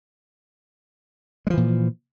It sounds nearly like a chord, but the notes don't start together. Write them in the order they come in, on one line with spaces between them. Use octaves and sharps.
G#3 F3 E3 A#2